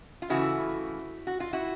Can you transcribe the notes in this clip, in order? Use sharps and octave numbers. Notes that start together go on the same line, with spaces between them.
F4
C#3 E3 A3 E4 F#4
F#4
F4
E4 F#4